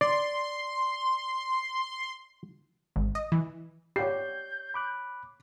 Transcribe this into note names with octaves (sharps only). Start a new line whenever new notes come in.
D5 C6
G#1
D#5
E3
G4 C#5 F#5 G6 C7
B5 D6 F#6